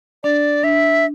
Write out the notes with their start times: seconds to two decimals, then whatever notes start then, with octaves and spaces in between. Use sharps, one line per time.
0.23 D4 D5
0.63 D4 E5